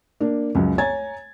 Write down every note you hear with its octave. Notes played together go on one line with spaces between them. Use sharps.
A#3 D4
C#2 F#2
C#5 G#5 A#5 G#6 A6